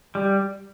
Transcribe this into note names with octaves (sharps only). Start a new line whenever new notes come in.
G3